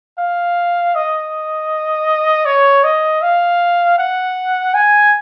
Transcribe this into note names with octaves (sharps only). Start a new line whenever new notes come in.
F5
D#5
C#5
D#5
F5
F#5
G#5